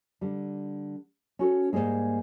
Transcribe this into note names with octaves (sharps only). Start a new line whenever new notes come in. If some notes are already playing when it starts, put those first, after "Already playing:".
D3 G3
C#4 F#4 A4
G#2 C#3 G3 G#3 A#3